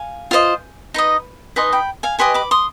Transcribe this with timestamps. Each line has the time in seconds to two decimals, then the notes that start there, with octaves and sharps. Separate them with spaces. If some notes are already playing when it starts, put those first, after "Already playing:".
Already playing: F5 G#5
0.31 F4 C5 D#5
0.94 D#4 B4 D#5
1.56 D#4 B4 D#5 G#5 C6
1.72 G5 B5
2.03 F5 G#5
2.19 G4 B4 D#5 G#5 C6
2.34 B5 D6
2.51 C6 D#6